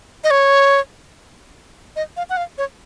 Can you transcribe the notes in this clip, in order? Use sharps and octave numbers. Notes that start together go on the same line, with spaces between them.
D#5
C#5
D#5
F5
F#5
F5
C#5